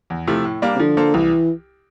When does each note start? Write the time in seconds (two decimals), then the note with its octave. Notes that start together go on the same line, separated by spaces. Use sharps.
0.10 E2
0.27 C3 F3 A3 E4
0.44 A2
0.62 G3 A#3 D4
0.75 C3
0.80 D3 F3
0.97 A#3 F4 A4 C5
1.14 C2 E3